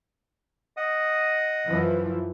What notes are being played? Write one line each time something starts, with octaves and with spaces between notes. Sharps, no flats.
D#5 F#5 D#6
F#2 E3 F3